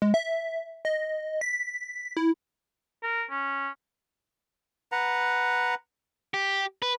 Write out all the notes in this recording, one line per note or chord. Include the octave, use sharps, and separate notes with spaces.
G#3
E5
D#5
B6
E4
A#4
C#4
B4 F#5 A#5
G4
B4